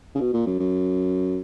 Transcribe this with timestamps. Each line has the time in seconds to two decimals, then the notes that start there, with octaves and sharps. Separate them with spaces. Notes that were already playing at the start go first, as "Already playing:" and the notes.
0.15 C#3
0.20 B2
0.34 A#2
0.46 F#2
0.60 F#2